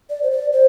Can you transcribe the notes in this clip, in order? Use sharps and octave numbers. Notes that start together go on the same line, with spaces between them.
D5
C5
D5
C5